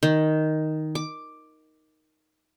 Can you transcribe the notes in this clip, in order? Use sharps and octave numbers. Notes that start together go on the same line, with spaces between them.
D#3
D6